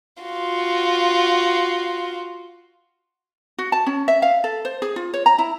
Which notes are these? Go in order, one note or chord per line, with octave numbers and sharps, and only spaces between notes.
F4 F#4
F#4
A5
C#4
E5
F5
A4
C5
G#4
F4
C#5
A#5
E4